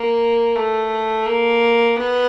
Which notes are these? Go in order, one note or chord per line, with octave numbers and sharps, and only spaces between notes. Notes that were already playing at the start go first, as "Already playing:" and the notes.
Already playing: A#3
A3
A#3
B3